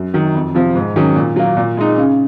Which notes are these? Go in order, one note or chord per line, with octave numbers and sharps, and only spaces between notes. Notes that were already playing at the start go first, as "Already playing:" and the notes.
Already playing: F#2
D#3 F#3
F2
C3 F3
G#2
D#3 F#3 C#4
A#2
F#3 A#3
A#2
G#3 D#4
C#3